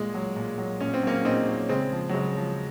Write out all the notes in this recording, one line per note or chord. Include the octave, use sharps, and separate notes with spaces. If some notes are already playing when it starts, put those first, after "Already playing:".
Already playing: A#2 G#3
F#3
A#2
F#3
A#2 C#4
C4
F#3 A#3 C#4
A#2 C4 D#4
F#3
C#3 G#3 C4
F3
F#3
C#3 G#3
F3